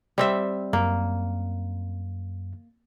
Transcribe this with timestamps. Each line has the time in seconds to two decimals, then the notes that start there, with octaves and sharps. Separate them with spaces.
0.18 G3 C4 E5
0.73 F#2 A#3